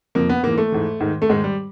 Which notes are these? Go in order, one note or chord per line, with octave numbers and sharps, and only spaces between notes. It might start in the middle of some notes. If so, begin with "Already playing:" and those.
F2 C3 F3 A#3
B3
G#2 E3 A#3
A3
G#2 E3
G#2 D#3
A3
G#2 D#3 G#3
G3